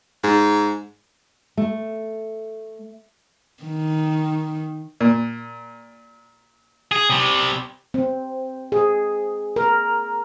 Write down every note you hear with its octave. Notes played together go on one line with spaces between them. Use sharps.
G#2
A3
D#3
A#2
G#4
C3 G3
C4
G#4
A#4